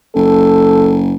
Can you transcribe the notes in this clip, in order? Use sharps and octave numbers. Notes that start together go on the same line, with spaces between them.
F#1 A4